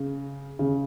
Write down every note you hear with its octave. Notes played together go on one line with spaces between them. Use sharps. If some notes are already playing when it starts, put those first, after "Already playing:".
Already playing: C#3
C#3